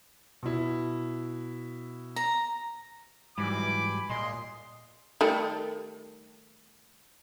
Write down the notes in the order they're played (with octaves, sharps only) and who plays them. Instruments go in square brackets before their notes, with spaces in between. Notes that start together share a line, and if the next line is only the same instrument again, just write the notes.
[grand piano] B2 E4
[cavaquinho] A#5
[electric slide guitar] G#2 F#3 G3 [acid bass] E3 [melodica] G#5 B5 [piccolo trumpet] D6
[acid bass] A#2 [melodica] G#3 G#4 D#5 [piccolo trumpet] C6
[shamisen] D#3 G3 A3